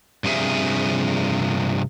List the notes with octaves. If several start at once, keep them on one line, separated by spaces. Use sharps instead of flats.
G2 C3 F3 G#4 E5